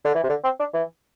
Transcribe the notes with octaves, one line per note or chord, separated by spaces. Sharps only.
D3
E3
C3
D3
C4
D4
E3